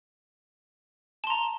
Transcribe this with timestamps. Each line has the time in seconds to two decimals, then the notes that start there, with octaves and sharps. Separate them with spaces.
1.24 A5
1.27 C6
1.30 A#5